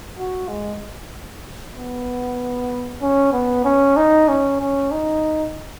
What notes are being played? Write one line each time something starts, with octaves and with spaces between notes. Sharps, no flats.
F#4
G#3
B3
C#4
B3
C#4
D#4
C#4
C#4
D#4